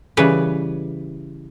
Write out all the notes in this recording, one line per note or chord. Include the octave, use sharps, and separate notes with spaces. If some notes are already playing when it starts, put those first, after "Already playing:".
C#3 E3 G3 B4